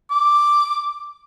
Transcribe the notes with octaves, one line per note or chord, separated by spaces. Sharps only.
D6